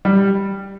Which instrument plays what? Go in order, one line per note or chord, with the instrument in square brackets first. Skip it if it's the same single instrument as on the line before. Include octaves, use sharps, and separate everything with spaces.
[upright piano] G3